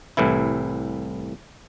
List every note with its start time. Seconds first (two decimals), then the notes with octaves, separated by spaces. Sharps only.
0.17 C2 A2 E3 E4